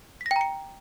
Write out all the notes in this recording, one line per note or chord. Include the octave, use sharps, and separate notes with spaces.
B6
A#6
G5
A#5
C#7